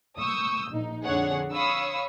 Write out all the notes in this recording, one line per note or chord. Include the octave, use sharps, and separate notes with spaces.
C#6 D#6 E6 G6
A#1 D#4
F2 D3 G#4 C#5 F#5
C#5 F5 B5 C#6 D#6 E6